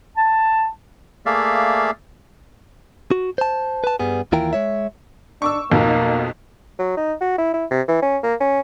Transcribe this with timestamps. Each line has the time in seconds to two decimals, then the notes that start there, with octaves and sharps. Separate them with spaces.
0.17 A5
1.26 A3 A#3 G#4 D5 E5 F5
3.11 F#4
3.38 C5 A5
3.84 B4 A5
3.99 G2 G3 B3 G#4
4.32 D#2 E3 E4 F4 A#4 G5
4.53 G#3 C#5 E5
5.42 D4 C#6 D6 E6
5.71 B1 F2 B2 A#3
6.79 F#3
6.97 D#4
7.20 F#4
7.38 E4
7.54 E4
7.71 C3
7.88 E3
8.02 C#4
8.23 A#3
8.40 C#4